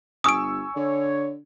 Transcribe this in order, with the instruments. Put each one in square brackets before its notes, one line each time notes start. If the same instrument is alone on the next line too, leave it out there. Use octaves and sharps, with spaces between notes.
[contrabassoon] G1 [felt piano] G#5 C#6 E6 [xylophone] D#6 D7
[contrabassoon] D3 [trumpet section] C#5